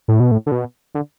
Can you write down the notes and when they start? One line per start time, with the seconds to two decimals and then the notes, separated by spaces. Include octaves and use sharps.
0.08 A2
0.20 B2
0.31 A2
0.46 D3
0.52 B2
0.95 D3